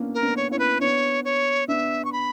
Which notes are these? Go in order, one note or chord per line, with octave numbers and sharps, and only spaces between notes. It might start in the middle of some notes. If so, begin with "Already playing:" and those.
Already playing: A#3 B3 C#4 D4 E4
A#4
B3 D4
C#5
C#4 E4 C#5
B4
B3 D4 C#5
C#5
B3 D4 E5
C#6
B5